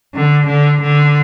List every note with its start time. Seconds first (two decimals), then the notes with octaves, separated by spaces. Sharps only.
0.14 D3
0.47 D3
0.81 D3